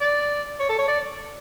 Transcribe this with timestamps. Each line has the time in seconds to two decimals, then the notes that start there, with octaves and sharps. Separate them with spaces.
0.01 D5
0.60 C#5
0.69 A4
0.78 C#5
0.88 D5